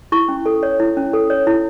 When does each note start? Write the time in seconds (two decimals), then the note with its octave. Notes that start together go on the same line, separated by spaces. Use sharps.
0.12 E4 C#6
0.28 C#4
0.46 A4
0.63 C#5
0.80 E4
0.97 C#4
1.13 A4
1.30 C#5
1.47 E4